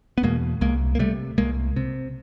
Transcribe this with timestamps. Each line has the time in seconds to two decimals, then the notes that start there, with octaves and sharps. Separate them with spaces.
0.18 B3
0.23 E2 B2 G#3 A#3
0.61 C2 G#3 A#3
0.95 A#3
0.99 C3 G3 A3
1.38 C2 G#3 A#3
1.76 C3